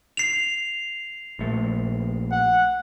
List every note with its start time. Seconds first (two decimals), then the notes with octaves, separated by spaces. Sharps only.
0.17 C7 F7
1.39 A#1 A3
2.32 F#5